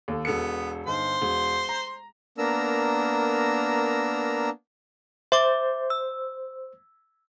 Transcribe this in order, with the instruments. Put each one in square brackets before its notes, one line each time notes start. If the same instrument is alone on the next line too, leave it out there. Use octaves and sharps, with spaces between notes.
[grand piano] D#2 A4
[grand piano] E1 A4 C#7 [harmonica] B3
[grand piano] G1 D#4 [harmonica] C5 C6
[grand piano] E1
A#5
[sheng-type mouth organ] A#3 B3 D4 A#4 A#5 E6
[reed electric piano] C5 [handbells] E5 D6
[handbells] E6